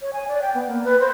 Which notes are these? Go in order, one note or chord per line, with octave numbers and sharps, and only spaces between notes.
C#5
G#5
D5
G5
B3
A#3
B4
C5